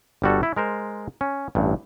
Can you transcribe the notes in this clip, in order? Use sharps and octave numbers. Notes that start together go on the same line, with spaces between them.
G1 G3 F#4 A4
E4
G#3 A#4 C5
C#4
A1 G2